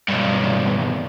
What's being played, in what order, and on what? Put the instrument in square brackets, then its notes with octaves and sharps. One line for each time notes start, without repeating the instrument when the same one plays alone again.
[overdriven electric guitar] B1 G2